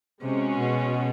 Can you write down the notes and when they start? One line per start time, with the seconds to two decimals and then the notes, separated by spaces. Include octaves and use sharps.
0.22 C3 G#3 C#4 F#4
0.58 B2